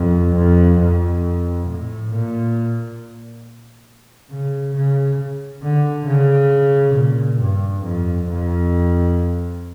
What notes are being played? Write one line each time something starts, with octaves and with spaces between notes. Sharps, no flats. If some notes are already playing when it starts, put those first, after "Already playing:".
Already playing: F2
F2
F2
A2
A#2
C#3
C#3
D3
C#3
A#2
G2
F2
F2